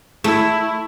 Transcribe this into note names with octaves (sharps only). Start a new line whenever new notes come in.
A3 E4